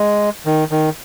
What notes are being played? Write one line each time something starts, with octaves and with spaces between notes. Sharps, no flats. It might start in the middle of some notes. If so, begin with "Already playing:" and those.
Already playing: G#3
D#3
D#3